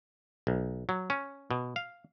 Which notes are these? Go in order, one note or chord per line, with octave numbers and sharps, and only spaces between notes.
B1
F#3
C#4
B2
F5